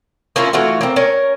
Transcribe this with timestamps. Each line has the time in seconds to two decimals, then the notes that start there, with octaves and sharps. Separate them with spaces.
0.36 A#3 C#4 E4 F4
0.53 E3 A3 F4 F#4
0.81 A#3 C4
0.96 C#4 A#4